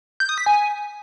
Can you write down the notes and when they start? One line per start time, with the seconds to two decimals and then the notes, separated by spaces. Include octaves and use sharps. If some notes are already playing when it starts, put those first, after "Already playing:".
0.20 G6
0.29 D#6
0.38 B6
0.46 G#5